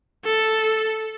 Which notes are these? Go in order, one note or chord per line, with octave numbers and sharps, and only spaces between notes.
A4